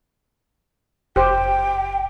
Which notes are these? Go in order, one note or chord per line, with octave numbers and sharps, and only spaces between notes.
F#1 G4 C5 G5